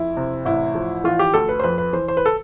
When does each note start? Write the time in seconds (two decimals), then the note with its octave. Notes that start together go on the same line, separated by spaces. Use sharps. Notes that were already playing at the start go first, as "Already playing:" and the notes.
Already playing: F2 E4
0.17 C3
0.45 A1 E4
0.75 F3
1.04 E3 F4
1.19 G4
1.34 D2 A4
1.49 B4
1.59 C5
1.64 F2 B4
1.78 B4
1.93 E3 C5
2.08 C5
2.17 B4
2.26 A4